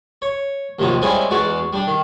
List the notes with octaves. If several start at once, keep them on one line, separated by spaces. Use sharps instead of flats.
C#5
D#2 C3 F3 F#3 D#4
G3 G#3 C4 C#4 E4 G#4
E2 G#3 F#4 D5
G3 D4
D#3